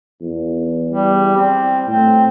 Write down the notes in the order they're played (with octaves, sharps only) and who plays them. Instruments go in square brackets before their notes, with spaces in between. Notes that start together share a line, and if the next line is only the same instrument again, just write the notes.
[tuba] E2
[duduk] G3
C4
[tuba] A2 [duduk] C4